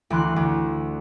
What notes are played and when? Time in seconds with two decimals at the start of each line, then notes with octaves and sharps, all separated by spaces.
0.10 D2 E3 C6 F#6
0.36 D2